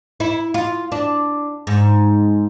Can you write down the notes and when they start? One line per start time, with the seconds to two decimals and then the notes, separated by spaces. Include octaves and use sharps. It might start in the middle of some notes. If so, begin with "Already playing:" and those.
0.20 E4
0.54 F4
0.92 D4
1.67 G#2